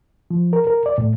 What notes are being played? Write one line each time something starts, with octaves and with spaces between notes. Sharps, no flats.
F3
A#4
A#4
D5
A2